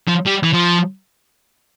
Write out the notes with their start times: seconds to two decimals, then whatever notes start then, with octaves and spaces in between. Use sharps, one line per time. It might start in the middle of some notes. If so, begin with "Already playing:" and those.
0.08 F3
0.27 G3
0.44 E3
0.53 F3